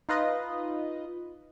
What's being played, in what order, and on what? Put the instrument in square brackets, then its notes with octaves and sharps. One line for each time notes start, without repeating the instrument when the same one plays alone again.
[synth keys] D#4 F4 B4 D#5